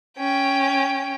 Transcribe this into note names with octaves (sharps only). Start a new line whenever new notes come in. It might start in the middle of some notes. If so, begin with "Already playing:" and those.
C#4 G5